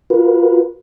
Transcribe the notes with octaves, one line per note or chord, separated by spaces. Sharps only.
F4 F#4 A#4 B4